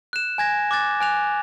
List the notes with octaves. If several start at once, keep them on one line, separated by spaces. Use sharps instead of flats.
F#6 E7
G#5 G#6 A#6
D6 F#6 A6
G#5 F#6 F7